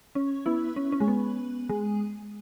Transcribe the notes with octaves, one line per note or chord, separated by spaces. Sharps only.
C#4
B3 E4
C#4
C#4
G#3
B3
G#3